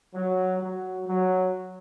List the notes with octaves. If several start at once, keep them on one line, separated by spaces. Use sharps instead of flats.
F#3
F#3
F#3